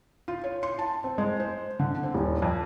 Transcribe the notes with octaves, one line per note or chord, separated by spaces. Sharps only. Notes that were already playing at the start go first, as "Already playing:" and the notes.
F4
C#5
C6
A5
C4
G#3
C5
D3
C4
D#1
F2